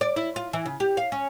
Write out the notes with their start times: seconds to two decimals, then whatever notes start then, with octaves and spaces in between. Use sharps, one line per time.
0.01 D5
0.16 E4
0.36 F4
0.53 E3
0.66 C#3
0.80 G4
0.97 F5
1.12 C#4